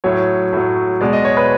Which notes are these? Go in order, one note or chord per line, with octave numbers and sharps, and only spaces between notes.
A2 F#3 C#5
A2 F#3
B2 G#3 D5
D#5
C#5
B4